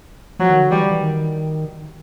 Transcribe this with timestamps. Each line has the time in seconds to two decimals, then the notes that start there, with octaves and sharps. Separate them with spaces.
0.39 F3 F#3
0.49 D#3
0.60 D3
0.70 E3 G3
0.91 E3
1.01 D#3